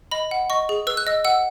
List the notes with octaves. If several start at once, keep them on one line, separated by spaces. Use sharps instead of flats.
D#5 B5
F#5
D#5 C#6
G#4
B4 E6
F#6
D#5 E6
F#5 E6